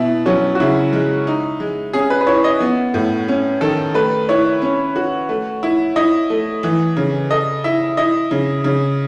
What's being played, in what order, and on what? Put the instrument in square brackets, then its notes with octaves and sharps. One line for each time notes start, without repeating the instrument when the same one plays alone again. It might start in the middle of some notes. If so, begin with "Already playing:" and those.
Already playing: [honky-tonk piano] B2 [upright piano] E4
[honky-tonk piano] F#3 [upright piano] C#4
[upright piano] F#4
[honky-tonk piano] C#3 [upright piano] E4
[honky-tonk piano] G#3
D#4
G#3
[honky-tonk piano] C#4 [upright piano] G#4
[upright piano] B4
B4
[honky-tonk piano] E4 [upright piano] C#5
[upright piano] D#5
[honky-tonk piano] B3
A2
C#4
[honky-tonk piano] D#3 [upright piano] A4
[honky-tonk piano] A3 [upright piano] B4
[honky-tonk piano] E4 [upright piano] C#5
[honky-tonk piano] C#4
F#4
A3
E4
[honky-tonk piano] E4 [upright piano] D#5
[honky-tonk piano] A3
E3
C#3
[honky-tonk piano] A4 [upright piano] D#5
[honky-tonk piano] E4 [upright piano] E5
[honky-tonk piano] E4 [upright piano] D#5
[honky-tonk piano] C#3
C#3